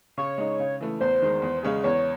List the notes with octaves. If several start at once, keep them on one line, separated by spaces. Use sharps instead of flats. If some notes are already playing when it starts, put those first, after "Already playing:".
C#3 C#5
G#3 D#4
C#3
E3 A3
E2 C5
D#3 G#3
E2
C#3 G#3 C#4 G#4
E2 C#5